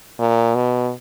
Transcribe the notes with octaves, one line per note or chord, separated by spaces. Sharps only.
A#2
B2